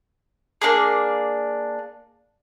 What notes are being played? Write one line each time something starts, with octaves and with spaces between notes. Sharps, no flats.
A#3 C#4 D4 G#4